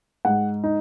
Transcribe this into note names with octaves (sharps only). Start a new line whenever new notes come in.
G#2 F#5
D#4